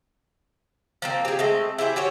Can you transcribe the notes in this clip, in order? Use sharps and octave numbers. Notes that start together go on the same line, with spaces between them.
F3 A#3 C4
G4 G#4
G#3 A3 C4
E4 G4 G#4 C5
F#4 G4 C5 C#5